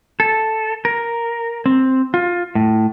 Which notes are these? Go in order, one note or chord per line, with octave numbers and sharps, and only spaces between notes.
A4
A#4
C4
F4
A2